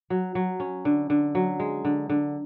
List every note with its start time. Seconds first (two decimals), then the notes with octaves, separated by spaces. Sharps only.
0.10 F#3
0.35 F#3
0.60 C#4
0.85 D3
1.10 D3
1.35 F#3
1.60 G#3
1.85 D3
2.09 D3